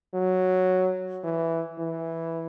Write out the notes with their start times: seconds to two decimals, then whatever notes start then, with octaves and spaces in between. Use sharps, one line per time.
0.14 F#3
1.24 E3
1.79 E3